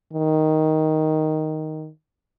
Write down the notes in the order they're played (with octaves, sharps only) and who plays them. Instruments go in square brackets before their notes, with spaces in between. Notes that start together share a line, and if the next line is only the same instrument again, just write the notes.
[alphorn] D#3